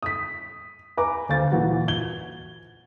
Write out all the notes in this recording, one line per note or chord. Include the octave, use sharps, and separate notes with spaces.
D#6 B6
B4 G#5 A#5 D6
D2 C5 F5 A6
A#2 E3 F#4
G#6 G7